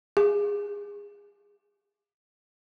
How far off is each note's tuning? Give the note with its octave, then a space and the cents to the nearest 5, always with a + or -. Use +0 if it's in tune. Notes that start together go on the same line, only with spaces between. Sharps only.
G#4 -25